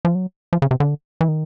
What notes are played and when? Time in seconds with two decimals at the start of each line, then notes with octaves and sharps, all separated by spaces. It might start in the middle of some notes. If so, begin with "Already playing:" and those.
0.05 F3
0.15 F#3
0.53 F3
0.62 C#3
0.71 C3
0.80 D3
1.21 E3
1.28 D#3